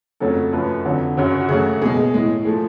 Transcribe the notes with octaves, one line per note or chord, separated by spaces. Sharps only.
F2 C#3 F#3 A3 A4
F#2 F3 A3 B4
F2 D3 F#3
F#2 C#3 F#3
F#4
F#2 C#3 F#3 A3 G#4
B2 G#3 G#4
G#4
A2 G#3
F3 A3 G#4